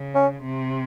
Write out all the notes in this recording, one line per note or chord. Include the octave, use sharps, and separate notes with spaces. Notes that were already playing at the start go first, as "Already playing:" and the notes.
Already playing: C#3
C#4
C3